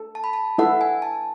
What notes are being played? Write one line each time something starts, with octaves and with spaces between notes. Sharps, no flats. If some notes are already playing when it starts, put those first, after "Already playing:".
Already playing: A4
A5
B5
A5
E4 A4 E5 F#5
G#5
A5